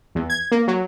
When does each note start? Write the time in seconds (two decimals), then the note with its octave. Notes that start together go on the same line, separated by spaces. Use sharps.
0.15 E2
0.30 G#6
0.51 A#3
0.68 F#3